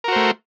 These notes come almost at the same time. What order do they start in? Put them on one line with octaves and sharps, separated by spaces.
A#4 F#4 C5 A3